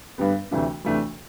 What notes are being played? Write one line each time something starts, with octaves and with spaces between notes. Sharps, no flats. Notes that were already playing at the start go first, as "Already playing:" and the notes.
G2 D3 G3 B3
D2 C3 E3 A3 D4
D2 C3 E3 A3 D4